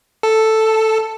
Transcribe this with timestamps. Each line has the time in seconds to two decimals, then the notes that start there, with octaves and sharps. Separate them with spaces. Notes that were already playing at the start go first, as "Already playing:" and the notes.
0.23 A4